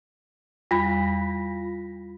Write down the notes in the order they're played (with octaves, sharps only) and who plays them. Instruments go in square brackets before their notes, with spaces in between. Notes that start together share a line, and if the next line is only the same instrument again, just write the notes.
[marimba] E2 G3 B5 [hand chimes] F4 A#6 B6